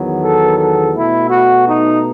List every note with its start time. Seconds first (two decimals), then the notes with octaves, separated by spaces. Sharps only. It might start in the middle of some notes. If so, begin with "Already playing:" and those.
Already playing: E2 D#3 F#3 B3
0.22 A4
0.58 A4
0.94 B2 A3 E4
1.31 F#4
1.67 D#4